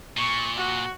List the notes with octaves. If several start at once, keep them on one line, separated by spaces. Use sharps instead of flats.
A#2 C#6
F#4